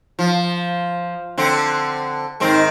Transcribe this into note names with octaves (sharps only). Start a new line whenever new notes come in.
F3
D3 C4
G#2 D#3 C4